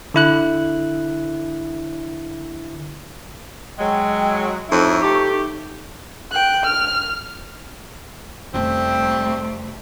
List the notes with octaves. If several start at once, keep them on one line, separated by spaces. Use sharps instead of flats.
D3 E4 F#6
F#3 G#3 D#5 G5 E6
F2 A2 D#4 E4 C#6
A3 G4
G5 F#6
F6
F1 G3 A3 C4 C#4